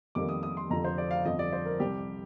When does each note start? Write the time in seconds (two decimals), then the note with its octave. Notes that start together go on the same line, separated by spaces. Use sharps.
0.15 F2 D#3 G3 A#3 D6
0.29 D#6
0.43 D#6
0.57 C6
0.70 F1 F2 D3 F3 A#5
0.84 C5
0.98 D5
1.11 F5
1.25 G1 F2 D3 F3 D#5
1.39 D5
1.53 C5
1.66 A#4
1.80 C2 C3 G3 G4